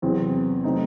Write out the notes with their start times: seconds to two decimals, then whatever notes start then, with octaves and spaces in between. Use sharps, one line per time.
0.02 E2 C3 F#3 C4
0.64 C3 F#3 A3 C4 D#4